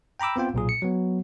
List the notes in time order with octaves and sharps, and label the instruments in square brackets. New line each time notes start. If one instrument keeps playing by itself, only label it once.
[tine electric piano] G5 A#5 B5 D6 E6
B3 C4 F4 G5
B1 A#2 G#4
C#7
F#3 B3